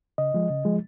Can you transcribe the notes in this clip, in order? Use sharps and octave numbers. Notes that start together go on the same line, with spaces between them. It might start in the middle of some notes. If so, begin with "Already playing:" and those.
C#3 D#5
F3 G#3
C#3
F3 G#3